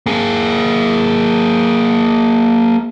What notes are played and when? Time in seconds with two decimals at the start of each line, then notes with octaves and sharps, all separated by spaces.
0.06 A#3 G#4